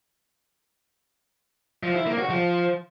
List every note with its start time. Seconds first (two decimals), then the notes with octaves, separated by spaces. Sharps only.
1.83 F3
1.95 E4
2.06 A#3
2.18 F#4
2.30 F3